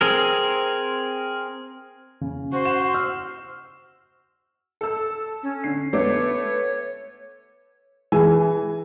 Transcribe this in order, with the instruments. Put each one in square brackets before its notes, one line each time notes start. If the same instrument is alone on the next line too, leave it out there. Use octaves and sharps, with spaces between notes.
[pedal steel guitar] C4 G#4 A#4
[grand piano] C#3
[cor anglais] F#4 [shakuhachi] C5
[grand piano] F#5 E7
E6 F6
[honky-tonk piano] A4 E6
[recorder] C#4
[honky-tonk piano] D3 C7
[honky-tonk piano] A3 B3 D6 [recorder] C#5
[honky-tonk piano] E3 [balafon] G#4 [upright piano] G#5